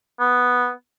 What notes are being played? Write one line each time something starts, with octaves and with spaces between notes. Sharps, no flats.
B3